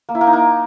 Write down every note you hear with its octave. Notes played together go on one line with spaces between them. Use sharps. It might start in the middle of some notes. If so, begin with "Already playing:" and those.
A#3
E4
A#3
D#4
A#3